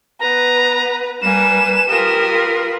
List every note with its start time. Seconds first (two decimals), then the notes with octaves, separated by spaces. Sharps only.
0.20 B3 B4 A#5
1.22 G3 A#3 B4 G#5 E7
1.90 F4 G4 A#4 B4 D#6